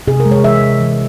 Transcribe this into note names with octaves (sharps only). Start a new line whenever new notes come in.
C3 G#4
A#4
G#3
C#5
E3 E5
C3
E3